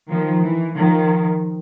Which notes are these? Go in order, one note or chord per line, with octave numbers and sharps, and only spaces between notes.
D#3 F3
E3
D#3 F3